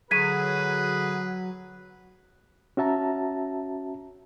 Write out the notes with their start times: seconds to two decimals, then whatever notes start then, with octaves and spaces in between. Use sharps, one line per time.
0.11 D3 F#3 G#4 B4 G#6 B6 D#7
2.77 C#4 F#4 E5 A5 A#5